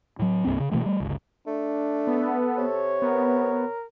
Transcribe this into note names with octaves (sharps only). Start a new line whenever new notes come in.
A2 F#3
C2 G2 A#3 C4
C#3
B2 E3 A3 A#3
G3 A3
G1 C#2
A3 D4
B3 A4
C3 C#5
B3 A#4